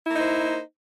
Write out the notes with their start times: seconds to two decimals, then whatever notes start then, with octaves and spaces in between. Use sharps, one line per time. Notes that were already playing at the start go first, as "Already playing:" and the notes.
0.06 E4
0.10 A#3
0.15 D#4
0.20 C5